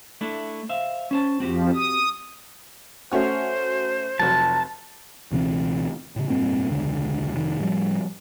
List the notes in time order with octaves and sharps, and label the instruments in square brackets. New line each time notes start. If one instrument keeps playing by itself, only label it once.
[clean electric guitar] A3 D4 E4
C5 E5 F5
C#4 C5 A5
[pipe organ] F2 F3 [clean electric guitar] C4 F#4 G4
[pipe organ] D#6
[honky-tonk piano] A3 C#4 F#4 [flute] C5
[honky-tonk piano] F1 F#3 [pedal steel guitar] A5
[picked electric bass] C#2 B2 E3 C4
A2 C#3
F1 G2 A#2 C4
E1 C#2 D3
F1 D#3
A2 F3 G3